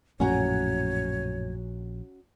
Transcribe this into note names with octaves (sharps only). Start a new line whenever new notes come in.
A#1 F#2 A2 C#4 F#4 C#5 A#5